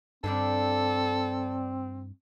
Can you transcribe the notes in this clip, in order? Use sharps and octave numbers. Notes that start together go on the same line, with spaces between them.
G2 D3 G3 C4 D4 A4